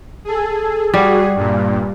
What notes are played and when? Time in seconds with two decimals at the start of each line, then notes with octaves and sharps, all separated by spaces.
0.25 G#4 A4
0.94 G3 F#4 G#4
1.36 G2 A#2